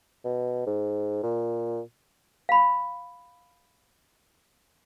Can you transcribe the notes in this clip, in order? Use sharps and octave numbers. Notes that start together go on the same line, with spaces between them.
B2
G#2
A#2
F5 B5